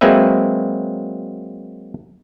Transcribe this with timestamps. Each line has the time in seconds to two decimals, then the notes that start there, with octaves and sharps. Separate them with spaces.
0.01 F#3 G#3 A#3 C4 B4 E5